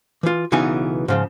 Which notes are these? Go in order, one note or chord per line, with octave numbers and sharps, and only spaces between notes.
E3 F4
B1 C#3 E3 B3 D#4 G#5
G#2 C#3 F3